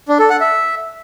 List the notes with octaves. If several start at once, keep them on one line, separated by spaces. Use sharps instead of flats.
D4
A4
F#5
E5